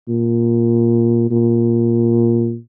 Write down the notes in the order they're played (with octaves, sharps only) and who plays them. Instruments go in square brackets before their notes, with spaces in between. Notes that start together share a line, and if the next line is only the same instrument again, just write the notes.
[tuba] A#2
A#2